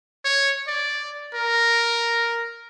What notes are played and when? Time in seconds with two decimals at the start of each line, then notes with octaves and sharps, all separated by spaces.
0.25 C#5
0.67 D5
1.34 A#4